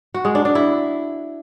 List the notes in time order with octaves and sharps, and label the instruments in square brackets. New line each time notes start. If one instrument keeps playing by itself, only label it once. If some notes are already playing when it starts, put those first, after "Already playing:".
[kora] F#4
G#3
D4
D4
E4